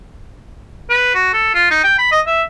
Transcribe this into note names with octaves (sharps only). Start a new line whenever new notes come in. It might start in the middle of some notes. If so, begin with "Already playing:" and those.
B4
F#4
A4
F4
D#4
G5
B5
D#5
E5